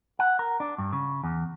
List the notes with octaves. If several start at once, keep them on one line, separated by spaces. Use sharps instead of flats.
F#5
A#4
D4
G2
C#3
E2